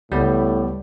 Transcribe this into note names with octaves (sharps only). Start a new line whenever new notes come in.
C#2 A2 G3 B3